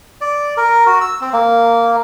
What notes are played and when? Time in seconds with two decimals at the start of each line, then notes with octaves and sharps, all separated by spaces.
0.21 D5
0.57 A#4
0.86 F#4
1.01 E6
1.21 C4
1.33 A#3